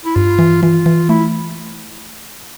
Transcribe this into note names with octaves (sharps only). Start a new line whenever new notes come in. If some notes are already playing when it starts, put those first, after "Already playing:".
E4
G2 F4
E3
E3 F4
E3
A3 E4